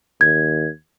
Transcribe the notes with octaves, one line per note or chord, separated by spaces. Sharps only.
D#2 G#6